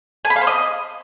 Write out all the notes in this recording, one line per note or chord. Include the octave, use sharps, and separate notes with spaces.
G#5
B5
F5
C5
D#5